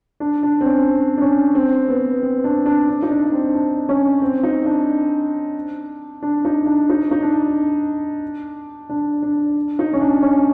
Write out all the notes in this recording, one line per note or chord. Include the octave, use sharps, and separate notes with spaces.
D4
D4
C4
C#4
D4
C#4
C4
B3
C4
D4
D4
D4
D#4
D4
C4
D4
C#4
C4
D#4
D4
D4
D#4
D4
D#4
D#4
D4
D4
D4
D#4
C#4
D4
C#4